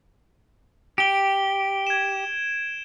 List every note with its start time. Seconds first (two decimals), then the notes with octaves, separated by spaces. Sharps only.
0.98 G4 D7 G7
1.87 G#6 E7